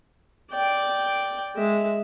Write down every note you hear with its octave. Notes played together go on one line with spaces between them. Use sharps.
D5 G5
G#3 E5